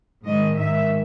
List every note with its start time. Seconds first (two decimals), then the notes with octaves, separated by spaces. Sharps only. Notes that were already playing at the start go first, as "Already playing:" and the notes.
0.24 G#2 D#3 D#5
0.56 G#2 D#3 E5